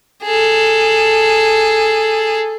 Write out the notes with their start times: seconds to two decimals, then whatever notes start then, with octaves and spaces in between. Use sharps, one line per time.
0.23 G#4 A4